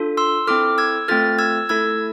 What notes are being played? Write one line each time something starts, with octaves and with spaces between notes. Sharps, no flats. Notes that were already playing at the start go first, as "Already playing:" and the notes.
Already playing: D4 F4 A4
C6 E6
C4 E4 A4 D6 F6
E6 G#6
A3 C4 F4 A4 F6 A6
E6 G#6
A3 E4 A4 E6 G#6